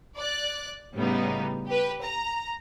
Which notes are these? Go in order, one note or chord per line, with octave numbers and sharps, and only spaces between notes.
D5 F#6
A2 C#3 G3 B3 D#4
G4 B4
A#5